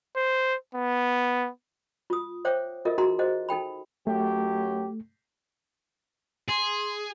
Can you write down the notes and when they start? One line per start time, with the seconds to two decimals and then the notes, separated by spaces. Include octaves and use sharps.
0.16 C5
0.75 B3
2.10 F4 D#6
2.45 C5 C#5 E5 F#5 G5 D6
2.85 F4 A4 A#4 D#5 E5
2.98 D#4 F#4 G#4 F#5 A#5 C6
3.19 G#4 C5 D#5 F#5
3.49 D#4 A4 G5 B5
4.07 F#2 F#3 A3 G4
6.49 G#4 C6